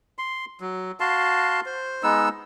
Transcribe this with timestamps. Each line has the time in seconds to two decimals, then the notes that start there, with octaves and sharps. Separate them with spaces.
0.19 C6
0.61 F#3
1.00 F#4 F5 A5 C6
1.66 C5
2.03 G#3 B3 D#4 E6